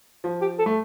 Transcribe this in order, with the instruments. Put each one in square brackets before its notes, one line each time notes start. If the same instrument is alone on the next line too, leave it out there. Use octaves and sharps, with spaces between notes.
[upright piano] F3
[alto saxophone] G4
A4
[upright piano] A3